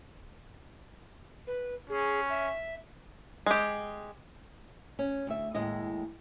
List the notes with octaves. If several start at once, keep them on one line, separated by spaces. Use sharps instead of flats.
B4
C#4 G#4
E5
G#3 G4
C#4
D2 E5
D#2 A2 G#3 D#5